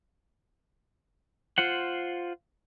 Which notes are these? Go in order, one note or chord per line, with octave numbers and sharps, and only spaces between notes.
F4 C5 F#5